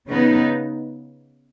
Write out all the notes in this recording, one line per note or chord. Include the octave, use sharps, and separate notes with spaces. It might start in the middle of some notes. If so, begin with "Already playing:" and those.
C#3 B3 D#4